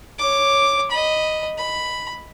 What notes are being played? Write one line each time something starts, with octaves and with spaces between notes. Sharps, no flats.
C#5 D6
D#5 B5
B5